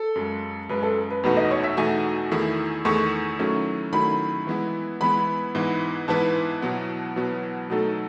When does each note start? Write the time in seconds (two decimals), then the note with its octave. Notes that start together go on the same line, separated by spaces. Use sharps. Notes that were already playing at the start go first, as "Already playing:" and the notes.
Already playing: A4
0.16 F#2 C#3 G#3
0.69 F#2 C#3 G#3 B4
0.83 A4
1.10 B4
1.24 E2 B2 A3 D#4 F#4 B4
1.37 D#5
1.51 C#5
1.63 E5
1.77 E2 B2 A3 D#4 F#4 G#5
2.31 E2 D#3 A3 E4 G#4
2.85 E2 D#3 A3 E4 G#4 C#6
3.39 D#3 F#3 A3 C#4 E4
3.92 D#3 F#3 A3 C#4 E4 B5
4.47 E3 G#3 B3 E4
5.01 E3 G#3 B3 E4 B5
5.55 G#2 E3 B3 E4 B4
6.08 G#2 E3 B3 E4 B4 A5
6.62 B2 F#3 B3 E4
7.16 B2 F#3 B3 E4
7.70 B2 F#3 A3 D#4 A4